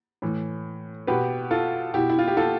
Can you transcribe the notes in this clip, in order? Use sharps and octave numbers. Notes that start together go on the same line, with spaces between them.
A2 E3
B2 G4 B4
F4 A4
B2 E4 G4
E4
F4
G4
F4 A4